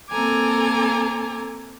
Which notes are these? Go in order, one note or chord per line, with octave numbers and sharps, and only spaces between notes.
A#3 C4 A4 G#5 A#5 D6